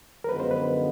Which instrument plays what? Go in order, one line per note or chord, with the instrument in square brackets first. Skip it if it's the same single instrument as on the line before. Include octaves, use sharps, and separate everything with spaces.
[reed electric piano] A#4
[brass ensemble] F#2 D3 F3 G#3 B3 [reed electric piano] B4
[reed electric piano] C5
B4